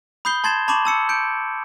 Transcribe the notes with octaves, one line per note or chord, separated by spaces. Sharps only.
B5 D#6 G6 C7 G7
A5 C6 G#6 A6 C7 E7
A5 B5 C#6 D6 E7 F#7
A5 E6 C#7
G6 C#7 D7